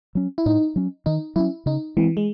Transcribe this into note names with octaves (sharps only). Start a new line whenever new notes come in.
F#3 C#4
E4
A2 D#4
F#3 C#4
D#3 D#4
F#3 C#4 E4
C#3 D#4
E3 G#3 C4
G#3